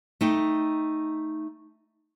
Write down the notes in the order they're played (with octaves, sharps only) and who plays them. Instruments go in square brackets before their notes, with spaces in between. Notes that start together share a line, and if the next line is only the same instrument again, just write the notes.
[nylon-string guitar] A3 D#4 G5